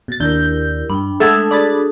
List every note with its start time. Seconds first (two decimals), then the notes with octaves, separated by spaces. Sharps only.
0.08 B2 A6
0.20 D#2 D4 E4 G4 A#4 G6
0.90 G2 D4 G5 B5
1.20 G#3 A3 A4 E5 F#5 D#6
1.51 D4 F#4 G#4 D5 B5 D#6 A6